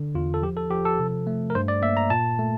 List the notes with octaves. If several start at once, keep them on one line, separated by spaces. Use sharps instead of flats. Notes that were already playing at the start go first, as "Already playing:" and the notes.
Already playing: D3
E2 F4
A4
F3 G4
A4
F3 G4
A4
C3
A3
A#4
G2 C5
D5
A#3 E5
A#5
A#2 A5
A3